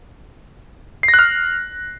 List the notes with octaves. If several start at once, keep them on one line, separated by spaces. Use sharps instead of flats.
C7
A#6
F#6
F6